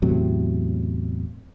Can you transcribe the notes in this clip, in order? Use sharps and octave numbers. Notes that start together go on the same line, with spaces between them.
E2 A2 C3 F#3